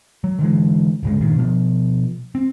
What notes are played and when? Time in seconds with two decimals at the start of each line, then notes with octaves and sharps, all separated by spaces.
0.24 F#3
0.39 D3 E3 G#3
1.03 D1 G1 C#3 G#3
1.21 G2 A#2 D#3
1.35 B2 F3
2.35 C4